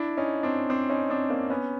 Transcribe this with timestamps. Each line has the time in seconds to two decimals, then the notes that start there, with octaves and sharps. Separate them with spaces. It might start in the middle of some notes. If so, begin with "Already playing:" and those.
Already playing: D4 E4
0.17 C#4 D#4
0.43 C4 D4
0.70 C4 D4
0.90 C#4 D#4
1.10 C4 D4
1.30 A#3 C4
1.50 B3 C#4